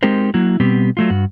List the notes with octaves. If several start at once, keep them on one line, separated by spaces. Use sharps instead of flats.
G#3 C4 D#4 G4 A#4 C5
F#3 A#3 E4 F#4
B2 G3 B3 C4 G4
F#3 A3 F4
G2 F#4